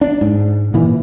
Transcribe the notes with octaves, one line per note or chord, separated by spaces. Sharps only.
D4
G#2
A#2 E3